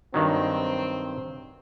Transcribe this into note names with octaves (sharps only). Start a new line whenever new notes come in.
G2 D#3 F#3 C4